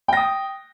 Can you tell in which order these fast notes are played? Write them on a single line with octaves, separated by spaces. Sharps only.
G5 A#6 D#6